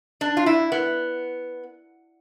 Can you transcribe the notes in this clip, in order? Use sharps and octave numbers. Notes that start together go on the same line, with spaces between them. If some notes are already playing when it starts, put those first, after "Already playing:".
D4
F4
E4
B3